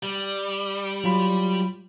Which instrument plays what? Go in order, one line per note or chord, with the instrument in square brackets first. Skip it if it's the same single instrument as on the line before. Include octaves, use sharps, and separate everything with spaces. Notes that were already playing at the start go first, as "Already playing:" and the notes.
[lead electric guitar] G3
[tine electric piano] F#3 F4 B5